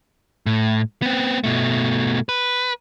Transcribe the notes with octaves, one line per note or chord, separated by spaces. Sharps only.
A2
B3 C4
B2 A3
B4